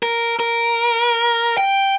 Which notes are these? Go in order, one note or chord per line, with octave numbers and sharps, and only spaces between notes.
A#4
A#4
G5